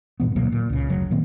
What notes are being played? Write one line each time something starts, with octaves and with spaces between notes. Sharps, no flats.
G2 A#2 E3 B3
D2 B2 F#3 A#3
A#2
C#2 C#3
F#1 D2 C#3 F#3
A#2 D#3 A#3 C4